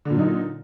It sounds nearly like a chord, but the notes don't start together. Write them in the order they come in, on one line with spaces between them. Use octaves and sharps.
D3 A#2 F#3 D#4